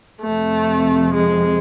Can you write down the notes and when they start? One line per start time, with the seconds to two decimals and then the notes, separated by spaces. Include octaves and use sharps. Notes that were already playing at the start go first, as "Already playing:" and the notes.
0.21 F2 C3 F3 A3
1.14 G#3